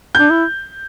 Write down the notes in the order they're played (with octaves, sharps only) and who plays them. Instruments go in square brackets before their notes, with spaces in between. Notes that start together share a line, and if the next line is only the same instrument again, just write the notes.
[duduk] D4 [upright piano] G6
[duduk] E4